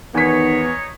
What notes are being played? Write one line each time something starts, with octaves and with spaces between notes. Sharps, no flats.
E2 D#3 B3 D#4 C#5 B6